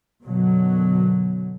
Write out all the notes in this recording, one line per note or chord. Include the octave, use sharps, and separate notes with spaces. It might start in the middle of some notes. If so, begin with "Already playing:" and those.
F#2 B2 D3 F#3